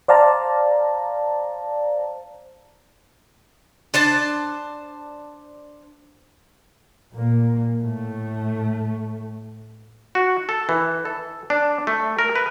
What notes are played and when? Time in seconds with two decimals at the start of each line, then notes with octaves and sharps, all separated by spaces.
0.08 C5 D5 F5 A5 A#5
3.94 D4 C5 A5
7.14 A#2 A#3
7.80 A2 A3
10.15 F#4
10.49 A4
10.69 E3
11.05 A4
11.50 D4
11.87 A3
12.19 A#4
12.35 B4